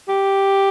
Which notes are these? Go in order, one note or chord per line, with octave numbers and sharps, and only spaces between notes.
G4